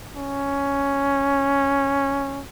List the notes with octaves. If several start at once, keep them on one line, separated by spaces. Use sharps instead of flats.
C#4